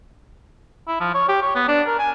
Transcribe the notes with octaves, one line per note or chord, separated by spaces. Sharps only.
E4
F3
C#5
G4
C#5
B3
D4
A#4
G#5